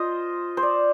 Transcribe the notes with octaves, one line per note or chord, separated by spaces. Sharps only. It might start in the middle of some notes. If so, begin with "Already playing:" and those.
Already playing: F4 C5 D#5
C5
D5